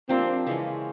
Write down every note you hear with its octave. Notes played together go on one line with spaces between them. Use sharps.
F3 A#3 C4 D4 G4
C#3 E3 G#3 C#4